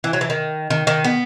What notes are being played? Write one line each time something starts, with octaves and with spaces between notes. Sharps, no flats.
E3
F#3
E3
D#3
D#3
D#3
B3